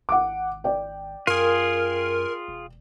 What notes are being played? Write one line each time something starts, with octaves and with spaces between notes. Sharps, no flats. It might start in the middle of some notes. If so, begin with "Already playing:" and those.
G#1 F#5 D6
D5 G5
F#2 F4 G#4 A#4
E1